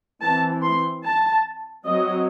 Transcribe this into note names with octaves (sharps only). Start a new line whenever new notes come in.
E3 C4 A5
C6
A5
F#3 C4 D#5